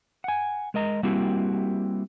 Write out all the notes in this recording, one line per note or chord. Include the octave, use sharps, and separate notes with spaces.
F#5 G#5
G#3 A#4 D#5 A#5
G3 A#3 C4 E4 F#4 G4